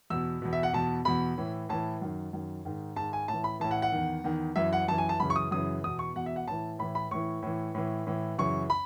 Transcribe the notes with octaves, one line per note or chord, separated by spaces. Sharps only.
E2 B2 E6
E2 B2
E5
F#5
E2 B2 A5
E2 B2 B5
A2 E3
A2 E3 A5
F#2 D#3
F#2 D#3
G#2 D#3
G#2 D#3 A5
G#5
A2 A5
E3
B5
A2 E3 A5
F#5
F#5
E2 D#3
E2 D#3
F#2 E3 E5
F#5
F#2 E3 A5
G#5
A5
F#2 C#3 E3 B5
C#6
D#6
F#2 C#3 E3 D#6
E2 B2 D#6
C#6
E2 B2 F#5
E5
F#5
A2 E3 A5
A2 E3 B5
B5
A2 E3 C#6
A2 E3
A2 E3
A2 E3
F#2 C#3 E3 C#6
B5